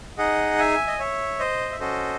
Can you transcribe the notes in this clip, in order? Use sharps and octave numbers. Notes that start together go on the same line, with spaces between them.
D#4 G#4 D#5 F#5
E5 G#5
D#5
C#5 E5
C5 D#5
E5
C#4 F#4 A4 C5 D#5